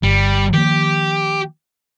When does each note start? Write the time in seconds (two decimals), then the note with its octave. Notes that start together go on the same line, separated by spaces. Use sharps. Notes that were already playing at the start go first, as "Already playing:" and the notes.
0.03 G1 G3
0.53 D#3 F3 A#3 G4